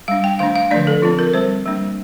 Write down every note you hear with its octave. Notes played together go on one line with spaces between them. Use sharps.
G3 D4 F5
G5
D#3 A3 D4 F5
F5
D3 F3 A3 D4 D5
A4
F3 C4 F4
A#4
G3 C4 C5
G3 A#3 D4